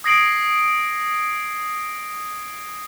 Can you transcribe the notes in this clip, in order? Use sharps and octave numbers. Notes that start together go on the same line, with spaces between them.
D#6 G#6 A#6 C7 D7 F#7